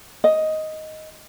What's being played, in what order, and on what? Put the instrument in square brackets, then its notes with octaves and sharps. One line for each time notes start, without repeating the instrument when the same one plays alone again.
[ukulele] D#5